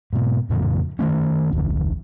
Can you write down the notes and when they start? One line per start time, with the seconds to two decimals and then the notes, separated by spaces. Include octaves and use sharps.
0.13 G#2 B2
0.50 F2 A2 C#3 F3
0.99 D#3 A3 C#4
1.53 D1 A1 F2 D3